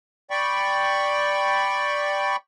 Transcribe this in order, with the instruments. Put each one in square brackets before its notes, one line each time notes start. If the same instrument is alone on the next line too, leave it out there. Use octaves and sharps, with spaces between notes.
[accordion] D5 G5 B5 C#6